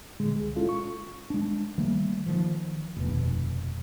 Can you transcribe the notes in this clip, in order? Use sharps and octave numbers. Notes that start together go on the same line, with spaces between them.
A#2 D3 G#3
C#2 G#4
G#3 C#4 E4 F4 A4
C#6
G#3 D4
D#3 G3 A3 A#3
D#3 F3
F1 D#2 B2